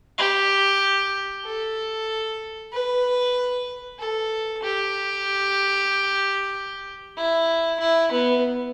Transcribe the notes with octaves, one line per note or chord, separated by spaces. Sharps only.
G4
A4
B4
A4
G4
E4
E4
B3